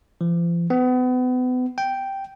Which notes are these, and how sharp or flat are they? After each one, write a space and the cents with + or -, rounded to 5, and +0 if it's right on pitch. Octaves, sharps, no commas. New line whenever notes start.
F3 -40
B3 +35
G5 -5